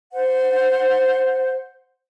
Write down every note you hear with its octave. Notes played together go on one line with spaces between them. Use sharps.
C5 F#5